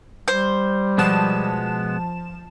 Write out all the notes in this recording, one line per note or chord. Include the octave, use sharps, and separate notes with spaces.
G3 C5
B2 F3 G#3 B3 A5 E7